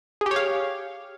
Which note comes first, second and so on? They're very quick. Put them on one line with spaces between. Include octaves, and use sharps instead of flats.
G#4 G4 C#5 F5